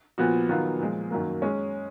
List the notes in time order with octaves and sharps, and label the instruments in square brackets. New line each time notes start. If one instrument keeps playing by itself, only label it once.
[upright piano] A#2 F3 B3 F#4
D#3 F#3 B3 F4
A#2 F3 G#3
F#2 D#3 F#3 A#3
G#3 C#4